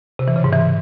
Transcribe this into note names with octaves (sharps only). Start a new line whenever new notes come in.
C3
E3
C#3
G#2
E3